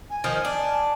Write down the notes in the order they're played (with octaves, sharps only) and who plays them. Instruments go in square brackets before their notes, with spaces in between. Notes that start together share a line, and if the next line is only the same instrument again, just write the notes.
[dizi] G#5
[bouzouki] D#3 F3 D#4
D4